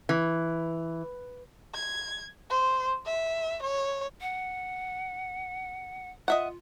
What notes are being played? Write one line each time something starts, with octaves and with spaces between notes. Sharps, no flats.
E3
G#6
C5
E5
C#5
F#5
F4 D#5 E5 F#5